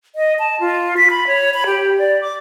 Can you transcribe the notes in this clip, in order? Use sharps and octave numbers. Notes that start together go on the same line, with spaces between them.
D#5
A5
F4
B6
B5
C#5
B5
G4
D5
D6